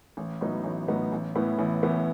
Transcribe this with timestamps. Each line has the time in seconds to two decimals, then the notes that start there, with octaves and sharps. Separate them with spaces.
0.17 A1
0.41 A2 F#3 B3 D#4
0.64 A1
0.88 A2 F#3 B3 D#4
1.12 A1
1.35 A2 E3 B3 E4
1.59 A1
1.82 A2 E3 B3 E4